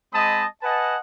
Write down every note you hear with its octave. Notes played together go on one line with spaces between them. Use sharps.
G#3 C4 D#5 A5 B5 D#6
B4 D#5 F#5 G#5 A5